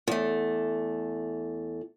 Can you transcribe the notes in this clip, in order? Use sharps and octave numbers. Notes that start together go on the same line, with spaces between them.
E2 A3